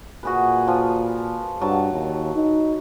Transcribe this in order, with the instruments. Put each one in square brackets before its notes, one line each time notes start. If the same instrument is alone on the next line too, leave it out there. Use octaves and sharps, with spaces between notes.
[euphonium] A#2 [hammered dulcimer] F#4 G#4 B4
[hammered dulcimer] F3
[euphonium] G2 [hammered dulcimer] F#3 A5
[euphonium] D#2
D#4